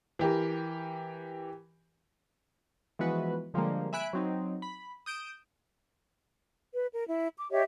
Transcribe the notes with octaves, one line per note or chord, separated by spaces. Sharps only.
E3 G4 A#4
E3 F3 G#3 B3 F#4 B4
D3 F3 G3 G#3 A#3
E5 G#5 B5 F#6 D7
F#3 C4 D#4
B5
D#6 G6 D7 E7
B4
A#4
E4
D6
G4 C#5 D#5 E5